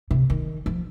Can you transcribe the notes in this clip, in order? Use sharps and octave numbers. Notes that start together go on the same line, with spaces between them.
C3
D#3
F3